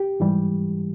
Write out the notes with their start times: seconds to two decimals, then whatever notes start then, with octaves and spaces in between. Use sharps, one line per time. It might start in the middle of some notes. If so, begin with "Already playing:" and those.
Already playing: G4
0.20 G#2 E3 G3